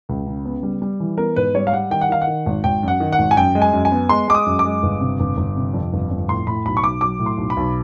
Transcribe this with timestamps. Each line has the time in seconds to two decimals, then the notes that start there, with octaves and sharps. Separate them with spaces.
0.09 C#2
0.26 C#3
0.45 B3
0.63 G3
0.82 G3
1.00 E3
1.18 B3 A#4
1.36 G#2 B4
1.54 G3 C#5
1.67 F5
1.73 G3 F#5
1.91 D#3 G5
2.01 F#5
2.09 D#3 F5
2.21 F#5
2.27 D#3
2.46 G#1
2.64 G#1 G5
2.83 F#2 F#5
3.00 D#3
3.12 F#5
3.19 G#1
3.31 G#5
3.36 F#2 G5
3.55 G#3
3.62 G#5
3.73 F#2
3.85 G#5
3.92 B3
4.09 G#3 C6
4.28 G#3 D6
4.35 D#6
4.46 F#2
4.59 D6
4.65 G#3
4.83 G1
5.00 C3
5.20 G1
5.37 G1
5.56 C3
5.74 F2
5.93 G1
6.11 F2
6.28 A2 C6
6.47 A2 B5
6.66 B1 B5
6.77 C#6
6.83 B1 D6
7.01 F#3 D6
7.19 A2
7.26 C6
7.38 B1
7.50 B5
7.57 B1